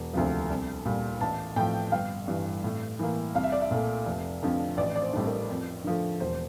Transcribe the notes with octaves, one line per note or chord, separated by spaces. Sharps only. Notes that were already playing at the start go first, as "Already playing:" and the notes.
Already playing: E1
D2 C3 F3
C2
A#2 G3
A1 A5
A2 F3 G5
G1 F5
G2 E3
A2
E3 A#3
C2 F5
E5
D5
E5
A#2 A3
F1
F2 D3 F3
A1 D5
D5
C5
A2 G3 D4
A#4
F2
D3 F3 A3
E1 C5